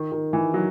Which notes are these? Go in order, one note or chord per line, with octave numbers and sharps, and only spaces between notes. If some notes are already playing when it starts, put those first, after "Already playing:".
Already playing: D#3
D#3
E3
F#3